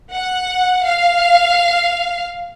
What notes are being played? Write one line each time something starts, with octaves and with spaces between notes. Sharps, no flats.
F#5
F5